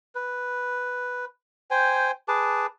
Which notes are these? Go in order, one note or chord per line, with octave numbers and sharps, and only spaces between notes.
B4
C5 G5 G#5
G#4 B4 A5 D6